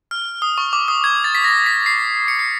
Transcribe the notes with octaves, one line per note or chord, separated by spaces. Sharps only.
F6
D#6
C#6
D6
D#6
G#6
A6
B6
A#6
B6
C7
C#7
C7